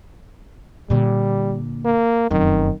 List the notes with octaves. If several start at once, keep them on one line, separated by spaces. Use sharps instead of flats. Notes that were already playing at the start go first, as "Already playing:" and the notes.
A#2 D3 G3
A#3
F1 F#2 D#3